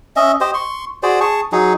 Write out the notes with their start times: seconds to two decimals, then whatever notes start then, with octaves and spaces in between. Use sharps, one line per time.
0.16 C#4 D#5 E5
0.41 G4 C5 D#5
0.54 C6 C#6
1.03 F#4 G#4 C5 D5
1.21 G#4 A5 C#6
1.52 F#3 D#4 G#4